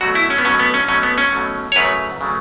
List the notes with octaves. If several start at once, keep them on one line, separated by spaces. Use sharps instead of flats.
B2 F#3 A3 F#4
E4
C#4
B3
B2 F#3 A3 C#4
B3
C#4
B2 F#3 A3 C#4
B3
C#4
B2 F#3 A3
C#5
F#2 C#3 F#3 A3 B4
C#3 F#3 A3